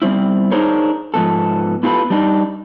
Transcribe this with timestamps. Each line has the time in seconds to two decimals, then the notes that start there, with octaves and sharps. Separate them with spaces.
0.02 G3 B3 C4 E4
0.51 D4 D#4 G#4 A#4 C5 C#5
1.14 G#2 F3 B3 A4
1.83 B3 E4 F4 G4 A4 B4
2.10 G3 D4 D#4